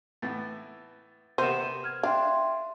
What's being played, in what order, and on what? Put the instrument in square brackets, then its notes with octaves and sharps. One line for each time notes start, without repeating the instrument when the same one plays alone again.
[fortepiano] A2 E3 B3 [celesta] A6
[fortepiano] C3 A#3 B3 [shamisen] C5 [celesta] D#7 E7
[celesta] F6 G#6
[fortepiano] D4 [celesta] E5 G5 C6 [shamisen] F5